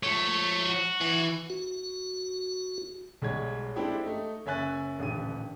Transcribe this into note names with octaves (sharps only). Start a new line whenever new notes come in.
F3 A3 C#5
F#4
E3
F#4
B1 G3 G#3 C#5 G#6
G#3 C4 D4 E4 G4 A4
A3 D#4
F#1 C#5 E5 G#5 F#6 A6
D#1 A1 D3 G4 D#7